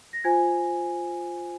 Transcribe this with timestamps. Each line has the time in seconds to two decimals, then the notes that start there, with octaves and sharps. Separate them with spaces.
0.13 A#6
0.24 F4 C5 G#5 G#6